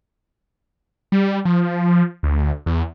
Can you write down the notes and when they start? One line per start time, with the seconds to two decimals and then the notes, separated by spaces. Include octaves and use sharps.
1.12 G3
1.45 F3
2.23 D2
2.66 E2